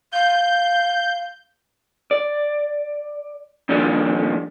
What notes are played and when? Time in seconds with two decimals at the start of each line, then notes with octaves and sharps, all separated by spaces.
0.12 F5 G6
2.11 D5
3.69 F2 A#2 D#3 G3 D4